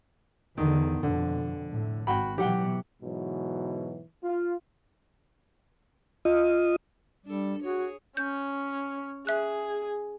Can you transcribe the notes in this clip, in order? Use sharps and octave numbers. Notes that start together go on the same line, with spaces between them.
E2 D3 D#3
F2 B2 D3
A2
G#1 F#4 G5 B5
B2 E3 F#3 G4 F#5 G5
G#2 B2 E3 F#3
F4
F4 D#5
G3 D4 A4
F#4 G#4 C#5
C#4 G6
G#4 E5 F#6